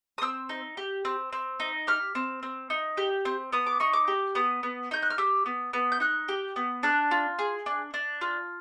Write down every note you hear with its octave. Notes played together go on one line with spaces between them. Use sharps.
D#6
C4 E6
D#4
G4
C4
C4
D#4
G4 F6
C4
C4
D#4
G4
C4
B3 D#6
D6
D#4 C#6
D6
G4
B3 D#6
B3
D#4 G6
F#6
F6
G4 E6
B3
B3
G6
D#4 F#6
G4
B3
D4 F#6
F4
G#4
D4
D4
F4